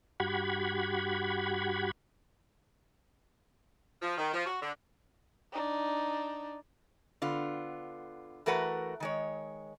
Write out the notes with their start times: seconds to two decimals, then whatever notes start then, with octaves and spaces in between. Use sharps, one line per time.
0.20 G2 F#4 G4 F#5 B5 G#6
4.02 F3
4.17 D#3
4.33 F3
4.45 F#4
4.61 D3
5.52 D4 D#4
7.22 D3 B3 F4
8.46 E3 A3 F#4 A#4 B4 F#5
9.00 D#3 G#3 C#5